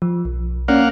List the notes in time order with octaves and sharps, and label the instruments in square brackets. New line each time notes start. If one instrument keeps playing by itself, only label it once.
[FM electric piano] F3
B1
[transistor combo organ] A#3 F5 F#5 [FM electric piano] C#4 D5